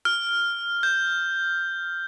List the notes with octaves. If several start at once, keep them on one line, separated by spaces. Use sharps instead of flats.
F6
G6